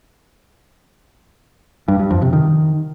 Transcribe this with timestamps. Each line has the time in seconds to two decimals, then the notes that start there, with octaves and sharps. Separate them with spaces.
1.88 G2
1.99 G2
2.11 F2
2.22 C3
2.33 D#3